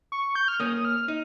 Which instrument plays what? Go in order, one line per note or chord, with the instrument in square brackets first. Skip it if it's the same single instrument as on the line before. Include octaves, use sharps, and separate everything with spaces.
[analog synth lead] C#6
G6
F6
[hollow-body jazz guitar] A#3 C#4 [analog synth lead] D#6
[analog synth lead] F6
[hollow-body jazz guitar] D#4